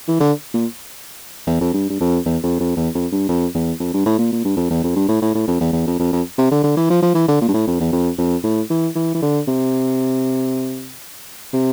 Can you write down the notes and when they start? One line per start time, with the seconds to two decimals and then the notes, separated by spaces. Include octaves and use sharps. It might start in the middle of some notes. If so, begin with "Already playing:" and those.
0.08 E3
0.20 D3
0.54 A#2
1.47 E2
1.61 F2
1.74 G2
1.90 G2
2.01 F2
2.25 E2
2.43 F2
2.60 F2
2.77 E2
2.95 F2
3.12 G2
3.29 F2
3.55 E2
3.80 F2
3.94 G2
4.06 A2
4.18 A#2
4.32 A#2
4.45 G2
4.57 F2
4.71 E2
4.84 F2
4.96 G2
5.09 A2
5.22 A2
5.35 A2
5.48 F2
5.61 E2
5.73 E2
5.87 F2
6.00 F2
6.13 F2
6.38 C3
6.52 D3
6.64 D3
6.77 E3
6.90 F3
7.02 F3
7.15 E3
7.28 D3
7.41 A#2
7.48 G2
7.54 A2
7.68 F2
7.80 E2
7.92 F2
8.19 F2
8.44 A2
8.70 E3
8.96 E3
9.15 E3
9.22 D3
9.48 C3
11.54 C3